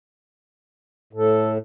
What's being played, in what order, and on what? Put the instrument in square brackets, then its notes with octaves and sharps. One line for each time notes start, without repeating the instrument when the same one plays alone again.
[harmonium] A2 [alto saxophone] A4